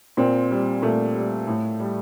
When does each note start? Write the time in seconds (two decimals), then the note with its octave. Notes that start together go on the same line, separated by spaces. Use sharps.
0.17 A#2 C4
0.51 G3
0.82 A#2 A3
1.15 G3
1.47 A2
1.80 G3